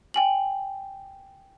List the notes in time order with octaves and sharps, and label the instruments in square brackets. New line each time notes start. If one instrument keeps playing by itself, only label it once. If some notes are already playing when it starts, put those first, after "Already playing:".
[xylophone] G5 G#5 F#7